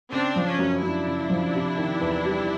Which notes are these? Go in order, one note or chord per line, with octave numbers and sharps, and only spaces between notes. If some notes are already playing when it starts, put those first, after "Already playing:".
C#3 C4 D4
F3
C#4
F#2
F#2 D4 E4
C#3
F3
C3
D#3
E2
G3